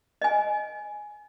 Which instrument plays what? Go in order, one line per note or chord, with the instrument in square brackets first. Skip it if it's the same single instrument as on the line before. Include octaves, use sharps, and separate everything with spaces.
[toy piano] D#5 G#5